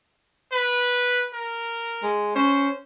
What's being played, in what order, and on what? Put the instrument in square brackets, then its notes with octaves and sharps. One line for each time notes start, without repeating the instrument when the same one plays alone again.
[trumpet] B4
A#4
[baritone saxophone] G#3
[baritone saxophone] C#4 [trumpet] C5